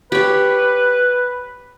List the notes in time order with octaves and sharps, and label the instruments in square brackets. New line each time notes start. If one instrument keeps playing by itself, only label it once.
[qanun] G4 C#5 [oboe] B4